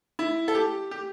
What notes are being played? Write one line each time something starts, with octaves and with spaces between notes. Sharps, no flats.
E4
A4
G4
G4